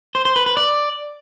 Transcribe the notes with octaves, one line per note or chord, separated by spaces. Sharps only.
C5
C5
B4
B4
D5